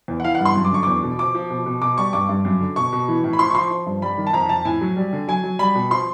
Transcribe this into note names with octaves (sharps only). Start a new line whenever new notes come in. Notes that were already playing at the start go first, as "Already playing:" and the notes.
E2
F#5
E3 F5
F#5
G2
C6
F#2
D6
D3 C#6
E2 D6
B2
F3 D6
F3
B2
B2
B2 D6
G3 C#6
G2 D6
G2
F#2
D3
B2 C#6
B2
E3
A2
B5
F3 C6
C#6
F3 C6
F3
G2
G3 B5
D#3
A5
F2 A#5
F2 A5
A2 G#5
F#3
G3
D3
F#3 G#5
F#3
G3 B5
B2
F3 C6